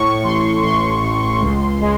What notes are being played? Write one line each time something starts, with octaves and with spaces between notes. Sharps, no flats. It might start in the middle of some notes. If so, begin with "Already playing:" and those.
Already playing: A2 C#6
A1 C6
A1 C6
A1
C#2
G#3